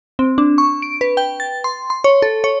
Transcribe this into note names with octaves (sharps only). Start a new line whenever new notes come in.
C4
D4
C#6
D7
B4
G5
A6
C6
C6
C#5
A4
C#5